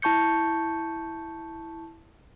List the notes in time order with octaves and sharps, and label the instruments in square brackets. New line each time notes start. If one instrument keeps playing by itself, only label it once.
[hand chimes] E4 A5 C#6 G6 C#7